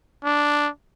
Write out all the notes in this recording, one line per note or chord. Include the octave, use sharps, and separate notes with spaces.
D4